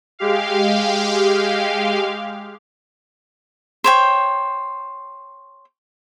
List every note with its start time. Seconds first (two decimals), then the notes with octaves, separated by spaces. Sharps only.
0.19 G#3 G4 F5
3.84 C5 C#5 G5